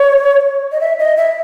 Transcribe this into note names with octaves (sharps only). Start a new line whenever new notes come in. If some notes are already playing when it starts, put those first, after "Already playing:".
Already playing: C#5
D#5
E5
D#5
E5